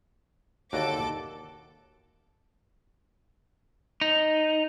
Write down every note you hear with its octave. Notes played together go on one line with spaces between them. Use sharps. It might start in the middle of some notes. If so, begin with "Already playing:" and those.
D#2 D3 F#4 A4 D6
D#4